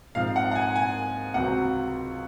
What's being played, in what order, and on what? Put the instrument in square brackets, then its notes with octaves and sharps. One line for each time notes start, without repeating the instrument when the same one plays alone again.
[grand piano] G#2 F3 C4 F5
F#5
F#5
G#5
G#5
C#2 C3 F#3 C4 F#5